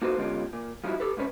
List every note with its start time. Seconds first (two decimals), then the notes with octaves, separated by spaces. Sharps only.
0.02 A#3 D#4 F#4 A4 B4 C5
0.17 D3 G#3 B3 C#4 F4 G4
0.53 A#2
0.84 F3 G3 D#4 E4 F#4
1.00 G4 A4 B4
1.17 G#2 C3 C#4 B4